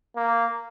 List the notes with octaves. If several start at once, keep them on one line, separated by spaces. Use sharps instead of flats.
A#3